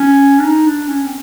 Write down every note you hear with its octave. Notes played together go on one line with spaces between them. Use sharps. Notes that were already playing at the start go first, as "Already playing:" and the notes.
Already playing: C#4
D4
D#4
D4
C#4
C4